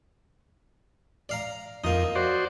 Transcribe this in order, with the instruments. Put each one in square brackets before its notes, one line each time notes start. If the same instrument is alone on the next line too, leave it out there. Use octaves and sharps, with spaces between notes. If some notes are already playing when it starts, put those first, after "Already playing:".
[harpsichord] D5 F5 A#5
[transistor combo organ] F2 D#5 [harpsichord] A#3 D#4
[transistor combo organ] F#4 C5 D5